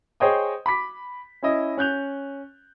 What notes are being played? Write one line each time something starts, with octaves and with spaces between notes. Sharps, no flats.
G#4 C5 C#5 D#5 G5 D#6
B5 D6 B6
C#4 E4 D#5
C#4 F#6 G6 F7